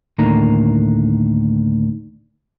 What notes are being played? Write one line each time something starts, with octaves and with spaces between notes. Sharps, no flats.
D2 A2 D#3 A#3 D4 A#5